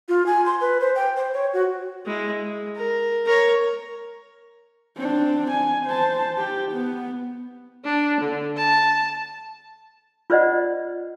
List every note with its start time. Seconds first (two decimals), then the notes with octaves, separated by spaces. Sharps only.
0.09 F4
0.26 G#5
0.46 C6
0.61 B4
0.81 C5
0.96 G5
1.17 C5
1.34 C#5
1.54 F#4
2.06 G#3 E4
2.42 G#3
2.76 A#4
3.25 A#4 C#5
4.96 C4 D4
5.51 G#5
5.86 C5 A5
6.38 G4
6.72 B3
7.84 D4
8.21 D3
8.57 A5
10.30 F4 B4 C5 D5 D#5 F#5